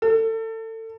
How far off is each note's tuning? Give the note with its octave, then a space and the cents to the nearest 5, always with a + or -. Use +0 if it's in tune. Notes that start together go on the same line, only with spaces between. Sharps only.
A4 +30